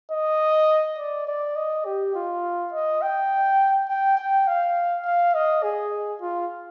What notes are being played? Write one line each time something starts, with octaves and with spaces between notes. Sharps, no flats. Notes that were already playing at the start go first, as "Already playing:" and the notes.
D#5
D5
D5
D#5
G4
F4
D#5
G5
G5
G5
F5
F5
D#5
G#4
F4